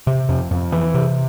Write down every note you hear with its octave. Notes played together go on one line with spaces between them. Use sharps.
C3
F2
F2
E3
C3